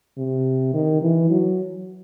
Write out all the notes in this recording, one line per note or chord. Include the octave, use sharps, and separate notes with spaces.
C3
D#3
E3
F#3